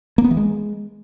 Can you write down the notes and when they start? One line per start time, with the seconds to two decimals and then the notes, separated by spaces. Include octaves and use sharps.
0.18 A#3
0.24 B3
0.31 E3
0.37 G#3